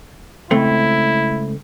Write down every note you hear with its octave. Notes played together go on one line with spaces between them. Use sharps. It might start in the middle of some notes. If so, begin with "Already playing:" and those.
C#2 A3 C4 E4